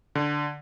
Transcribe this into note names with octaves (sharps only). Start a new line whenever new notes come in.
D3